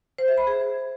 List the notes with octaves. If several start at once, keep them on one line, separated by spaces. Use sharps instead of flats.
C5
E5
B5
G#4